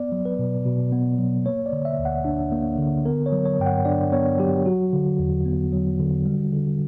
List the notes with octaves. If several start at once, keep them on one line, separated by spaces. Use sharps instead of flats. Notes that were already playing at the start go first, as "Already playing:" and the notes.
Already playing: B3 D5
F#3
B4
B2
B2
B3
F#3
A#3 C#5
D5
D3
E5
D2
F#5
D4
A#3
D3
B3 A#4
C#5
F#3
C#5
G2 G5
F#5
D4 D5
B3 C#5
F#3 G4
F#3 F#4
D3
E2
B3
F#3
D3
G3
D3